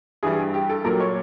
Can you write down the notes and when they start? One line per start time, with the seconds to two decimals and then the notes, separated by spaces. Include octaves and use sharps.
0.23 G2 E3 G3 G#4
0.54 G4
0.69 A4
0.84 A#2 F#3 A#4
1.00 C#5